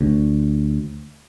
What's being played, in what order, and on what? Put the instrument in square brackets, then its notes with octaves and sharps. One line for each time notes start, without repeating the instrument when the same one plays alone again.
[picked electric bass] D2